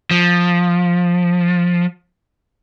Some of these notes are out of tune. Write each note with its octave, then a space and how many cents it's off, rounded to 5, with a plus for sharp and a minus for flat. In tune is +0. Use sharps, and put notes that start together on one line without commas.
F3 +10